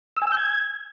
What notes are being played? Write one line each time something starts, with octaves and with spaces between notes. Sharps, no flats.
E6
G#5
E6
G6
G#6